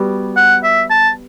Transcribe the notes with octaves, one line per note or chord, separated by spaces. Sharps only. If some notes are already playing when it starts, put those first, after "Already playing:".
Already playing: G3 B3 F#4
F#5
E5
A5